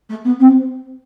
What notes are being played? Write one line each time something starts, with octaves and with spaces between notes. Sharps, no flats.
A3
B3
C4